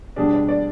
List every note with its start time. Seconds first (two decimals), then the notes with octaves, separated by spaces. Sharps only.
0.16 B2 G3 D4 G#4
0.33 D5
0.49 D5